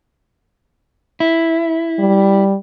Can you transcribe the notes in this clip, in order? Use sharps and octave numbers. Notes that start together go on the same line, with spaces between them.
E4
G3